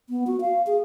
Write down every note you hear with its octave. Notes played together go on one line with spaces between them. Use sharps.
B3
F#4
F5
G#4